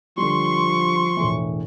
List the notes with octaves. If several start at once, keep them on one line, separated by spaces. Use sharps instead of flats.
D3 F3 G3 C6 C#6
E1 A2 E3